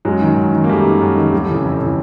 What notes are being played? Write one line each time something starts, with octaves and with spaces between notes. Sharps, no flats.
F#2 F#3 G#3
D#3
F#2
D#3
A#3
F#2 G3 A3
D#3
F#2
D#3
F2 G3 A3
C#3 E3
F2
C#3 E3